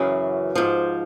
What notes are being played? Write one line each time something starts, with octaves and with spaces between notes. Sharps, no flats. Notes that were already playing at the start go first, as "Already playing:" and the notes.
Already playing: F#2 C#3 E3 F#4
G#2 F3